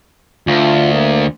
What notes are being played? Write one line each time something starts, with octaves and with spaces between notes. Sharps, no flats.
D2 F4
A#3